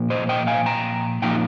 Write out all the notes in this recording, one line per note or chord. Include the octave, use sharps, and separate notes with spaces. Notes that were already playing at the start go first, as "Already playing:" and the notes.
Already playing: A#2 F3 A#3
C5 D#5
D#5 G5
F5 G#5
G5 A#5
A#2 F3 A#3 D#4 G5 A#5